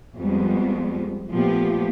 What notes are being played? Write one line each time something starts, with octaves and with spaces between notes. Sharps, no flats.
F2 G3 G#3 B3
A#2 F3 A3 B3 G4